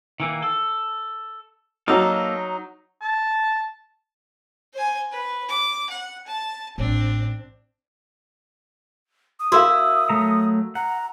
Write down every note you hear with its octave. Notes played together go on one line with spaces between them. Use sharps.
D#3 E3 A#3
A4
F#3 A#3 D#4 A4 F5
A5
C5 G#5
B4
D6
F#5
A5
A1 C4 D4
D#6
E4 F#4 A#4 F5
F#3 A3 A#5
F#5 A#5